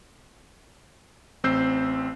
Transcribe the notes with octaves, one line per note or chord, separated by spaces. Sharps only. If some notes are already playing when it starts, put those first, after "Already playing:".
A1 C4 E6 G6 C7